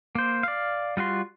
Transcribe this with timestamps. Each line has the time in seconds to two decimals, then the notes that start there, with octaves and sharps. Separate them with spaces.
0.15 A#3 C5
0.43 D5 F5
0.97 G3 F4 F#4 C6